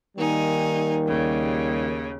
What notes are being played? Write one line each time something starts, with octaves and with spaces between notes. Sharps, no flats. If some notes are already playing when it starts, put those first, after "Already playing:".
D#3 G3 A#3 D#4 G#5
D#2 C#3